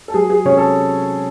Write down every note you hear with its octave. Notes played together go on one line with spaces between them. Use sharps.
A4
F#3 G#4
G#4
C3 C#4 C#5
A4